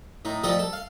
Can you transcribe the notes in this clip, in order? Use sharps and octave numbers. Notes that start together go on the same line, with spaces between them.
A2 D#4
F3 G3 A3 A4 D#5 D#6
A4
F5